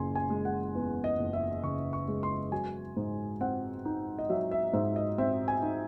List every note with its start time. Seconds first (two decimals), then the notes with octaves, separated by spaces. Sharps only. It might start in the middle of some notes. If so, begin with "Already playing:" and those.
Already playing: F#1 C#3 G#5 C6
0.15 G#5
0.30 G#3
0.45 F#5
0.75 E2
1.04 D#5
1.19 F#1
1.33 E5
1.63 C#3 C#6
1.93 C#6
2.08 G#3
2.23 C6
2.52 F#3 G#5
2.96 G#2
3.41 C4 F#5
3.85 D#4
4.19 D#5
4.30 F#3 E5
4.51 E5
4.73 G#2 E5
4.96 D#5
5.18 C4 E5
5.48 G#5
5.63 D#4